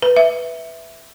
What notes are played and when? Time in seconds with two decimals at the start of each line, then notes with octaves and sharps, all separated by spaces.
0.02 B4
0.16 E5